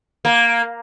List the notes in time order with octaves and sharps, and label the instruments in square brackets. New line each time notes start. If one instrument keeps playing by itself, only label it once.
[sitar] A#3